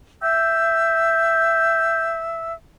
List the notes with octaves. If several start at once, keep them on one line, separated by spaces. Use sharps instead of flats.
E5 G5 E6